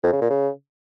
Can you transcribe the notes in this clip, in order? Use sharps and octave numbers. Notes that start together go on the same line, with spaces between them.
F2
C#3
A#2
C#3